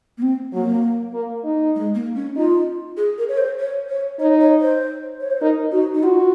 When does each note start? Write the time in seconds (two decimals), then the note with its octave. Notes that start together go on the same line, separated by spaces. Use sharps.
0.18 A#3
0.22 C4
0.53 F#3 A#3
1.14 A#3
1.44 D#4
1.75 G#3
1.95 A#3
2.16 C#4
2.36 D#4 F4
2.97 G#4
3.18 A#4
3.29 C#5
3.38 C5
3.59 C#5
3.89 C#5
4.19 D#4 C#5
4.40 C#5
4.60 C5
5.20 C#5
5.31 C5
5.41 D#4 A#4
5.72 D#4 F#4
5.94 D#4
6.03 F4 F#4